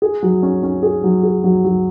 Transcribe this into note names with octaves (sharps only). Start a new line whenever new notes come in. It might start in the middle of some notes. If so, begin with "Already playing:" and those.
G#4
F#3
C#4
C#4
G#4
F#3
G#4
F#3
F#3